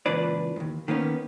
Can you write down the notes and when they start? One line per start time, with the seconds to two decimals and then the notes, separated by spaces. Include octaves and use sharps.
0.06 C#2 A#2 E3 D4 B4 D5
0.56 D#2 G#2
0.88 D#3 A#3 B3 C#4